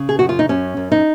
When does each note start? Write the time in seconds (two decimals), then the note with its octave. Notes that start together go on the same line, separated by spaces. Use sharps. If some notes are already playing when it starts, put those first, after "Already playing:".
Already playing: C#3
0.09 G#4
0.19 F#2 F#4
0.29 F4
0.39 D#4
0.49 F#2 C#4
0.77 F#2
0.92 D#4